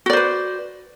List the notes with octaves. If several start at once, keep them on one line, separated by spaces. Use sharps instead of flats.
F#4 B4 C5 D5